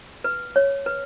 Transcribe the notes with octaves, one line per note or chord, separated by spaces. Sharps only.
B4
C#5
B4